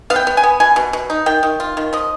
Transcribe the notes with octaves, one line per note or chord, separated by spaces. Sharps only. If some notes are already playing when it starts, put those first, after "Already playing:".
B3 F5
G5
B3
G#5
B3
B2 G#5
B2
B2
D#4
D#3 G5
D#3
F4
D#3
F3 D#5